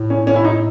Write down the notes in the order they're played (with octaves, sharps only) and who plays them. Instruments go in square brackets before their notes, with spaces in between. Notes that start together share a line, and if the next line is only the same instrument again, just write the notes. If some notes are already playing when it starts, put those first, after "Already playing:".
Already playing: [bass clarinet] A2
[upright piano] C#4
C#4
E4
D#4